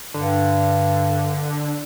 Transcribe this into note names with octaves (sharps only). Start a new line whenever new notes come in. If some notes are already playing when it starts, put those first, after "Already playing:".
G2 D3